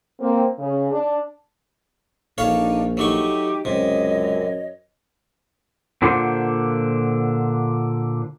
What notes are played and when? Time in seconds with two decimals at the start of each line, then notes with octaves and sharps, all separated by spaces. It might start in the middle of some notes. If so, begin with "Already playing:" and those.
0.20 A#3 C4
0.58 C#3
0.91 D4
2.38 A#1 D4 D#4 A4 C#5 F5
2.97 F#3 A3 D#4 G4 C#6 D6
3.65 C#2 F#2 C3 C#5 D#5
6.02 A#2 D3 D4 F4 C5 F#5